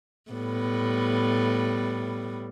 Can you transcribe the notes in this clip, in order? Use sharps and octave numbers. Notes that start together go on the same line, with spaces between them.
A2 G3 B3